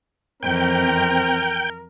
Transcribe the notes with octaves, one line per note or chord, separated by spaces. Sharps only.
F2 E3 C4 A#4 G5